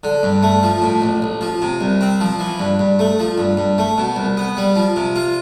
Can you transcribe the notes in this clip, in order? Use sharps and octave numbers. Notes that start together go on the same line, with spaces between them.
D3
G2
A3
F3
A2
A1
A1
F3
C3
C2
C4
F3
E3
G2
G2
A3
F3
G2
G2
A3
B2
C2
B3
G3
F3
C3
F4